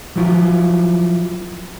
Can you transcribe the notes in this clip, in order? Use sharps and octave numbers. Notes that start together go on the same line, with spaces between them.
F3 F#3 E4 F4